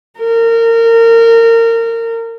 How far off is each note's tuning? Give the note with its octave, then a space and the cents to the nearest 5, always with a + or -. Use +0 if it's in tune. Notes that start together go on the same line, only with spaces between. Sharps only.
A#4 -25